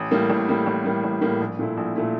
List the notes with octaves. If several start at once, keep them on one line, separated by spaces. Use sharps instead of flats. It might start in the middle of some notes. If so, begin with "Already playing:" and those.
Already playing: A1
A2 G3 A#3
A1
A2 G3 A#3
A1
A2 G3 A#3
A1
A2 G3 A#3
A#1
A#2 A3 E4
A#1
A#2 A3 E4